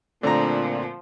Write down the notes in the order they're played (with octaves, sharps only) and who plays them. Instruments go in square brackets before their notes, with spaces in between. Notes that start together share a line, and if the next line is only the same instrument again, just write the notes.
[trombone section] A#2 [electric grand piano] D3 A3 C4 [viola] F3 [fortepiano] D4 A#5